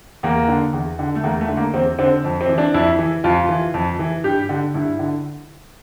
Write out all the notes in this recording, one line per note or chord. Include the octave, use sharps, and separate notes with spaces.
E2 A#3
D3
E2
D3
A3
E2 A#3
A3
D3
A#3
E2 C4
D3 C4
F2
C4
E3
D4
F2 E4
E3
F2 F4
E3
F2
E3
G2 G4
D3
G2 E4
D3